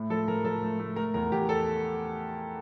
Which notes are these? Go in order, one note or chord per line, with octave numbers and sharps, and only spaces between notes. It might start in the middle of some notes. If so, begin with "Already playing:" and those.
Already playing: A2 A3
F3 A4
F3 A#4
F3 A4
A3
A3
A3 A#4
E2 A#4
E2 G4
A4